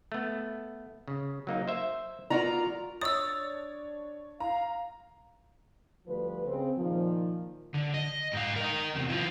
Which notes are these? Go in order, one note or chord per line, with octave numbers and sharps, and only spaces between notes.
A3 B3
C#3
F#3 A#3 D#4
C5 E5
B3 F4 F#4 A#4 D5 A#5
D4 C#5 D#6 E6 A6
F5 A#5
D2 F3 G3 B4
C#3 C4
A#2 D#3 F3
D3
D#5
G#2 F5
A#4 D#5
E2 C3
E3 F4